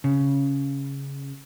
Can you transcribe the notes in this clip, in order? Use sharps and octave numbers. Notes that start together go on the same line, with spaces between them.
C#3